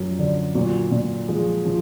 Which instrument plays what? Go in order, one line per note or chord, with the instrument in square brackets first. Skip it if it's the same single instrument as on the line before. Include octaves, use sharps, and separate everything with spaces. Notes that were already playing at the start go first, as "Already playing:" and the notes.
Already playing: [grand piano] F#2 F3
D3
A#2 F#3
A#2
F3 G#3
F3